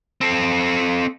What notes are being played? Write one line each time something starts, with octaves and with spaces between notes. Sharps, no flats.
C4 A4